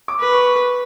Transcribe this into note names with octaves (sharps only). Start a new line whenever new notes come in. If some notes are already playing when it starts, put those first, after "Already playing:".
D6
B4
C#6